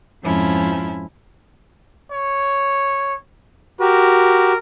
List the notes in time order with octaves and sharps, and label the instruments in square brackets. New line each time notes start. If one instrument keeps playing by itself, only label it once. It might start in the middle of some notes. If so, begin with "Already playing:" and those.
[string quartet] F2 G#2 F3 C#4 E4
[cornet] C#5
[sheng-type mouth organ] F#4 G4 [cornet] A#4